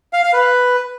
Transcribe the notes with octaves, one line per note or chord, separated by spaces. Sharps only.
F5
F5
B4